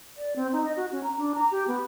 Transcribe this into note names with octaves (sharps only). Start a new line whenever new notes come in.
D5
C4
D#4
D#5
F#4
C#4
A#5
D4
A#5
G4
B3